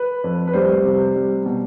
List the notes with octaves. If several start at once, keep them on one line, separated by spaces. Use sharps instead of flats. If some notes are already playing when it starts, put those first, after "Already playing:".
Already playing: B4
F2
B4
G3 C5
C3
G3
B2